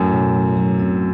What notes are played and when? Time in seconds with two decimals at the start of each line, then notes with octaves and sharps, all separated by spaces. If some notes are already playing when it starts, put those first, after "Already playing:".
Already playing: F#2 A2 F#3
0.13 B2
0.35 F#3
0.57 F#3
0.79 C4